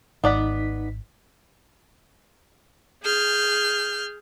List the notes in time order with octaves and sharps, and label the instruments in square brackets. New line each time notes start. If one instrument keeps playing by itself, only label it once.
[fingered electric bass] G#1 [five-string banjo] B3 D5 F#5 [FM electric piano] D#4 B6
[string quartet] G#4 F6 G6